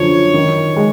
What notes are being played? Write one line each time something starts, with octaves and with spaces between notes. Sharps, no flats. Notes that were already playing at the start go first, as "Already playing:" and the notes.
Already playing: F#2 D3 F3 C#5
D#3
G#3